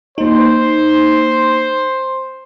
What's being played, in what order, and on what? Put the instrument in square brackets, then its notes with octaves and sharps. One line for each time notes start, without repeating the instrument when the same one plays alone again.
[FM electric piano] A#3 D#4 [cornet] C5